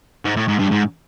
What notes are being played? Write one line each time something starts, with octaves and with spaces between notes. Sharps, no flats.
G#2
A2
G#2
G2
G#2